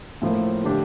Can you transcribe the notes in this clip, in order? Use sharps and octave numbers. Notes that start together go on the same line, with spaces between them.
A2 F3 A#3
D3 A3 D4 G4